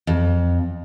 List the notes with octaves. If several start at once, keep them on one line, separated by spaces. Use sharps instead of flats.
F2